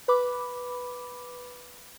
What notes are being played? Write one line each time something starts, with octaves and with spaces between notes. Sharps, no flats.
B4 B5 D6